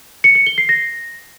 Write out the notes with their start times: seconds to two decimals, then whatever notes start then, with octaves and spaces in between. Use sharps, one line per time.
0.24 C#7
0.35 C#7
0.47 G7
0.58 C7
0.69 A#6